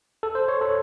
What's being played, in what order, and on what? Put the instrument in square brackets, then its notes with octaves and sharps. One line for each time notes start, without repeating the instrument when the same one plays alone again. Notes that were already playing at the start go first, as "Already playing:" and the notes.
[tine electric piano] A4
C5
C#5
A4